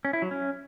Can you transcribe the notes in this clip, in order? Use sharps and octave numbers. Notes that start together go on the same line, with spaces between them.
C#4
E4
F#3
C#4